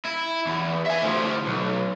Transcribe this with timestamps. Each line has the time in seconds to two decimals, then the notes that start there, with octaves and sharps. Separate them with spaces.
0.05 E4
0.47 E2
0.86 E5 G#5
1.02 D2 F3
1.46 B1